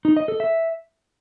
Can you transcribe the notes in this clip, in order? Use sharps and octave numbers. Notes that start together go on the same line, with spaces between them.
D#4
D#5
A4
E5